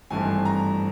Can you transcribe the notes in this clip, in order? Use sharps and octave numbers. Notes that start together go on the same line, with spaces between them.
G#1 G2 E3 A3 C4 G#5
A#5